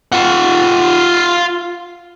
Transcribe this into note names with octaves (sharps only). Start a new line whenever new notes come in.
F4 F#5